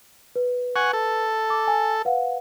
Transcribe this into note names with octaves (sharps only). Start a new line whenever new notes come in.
B4
F#5 G#5 C#6
A4
D6
G#5
B4 F5 F#5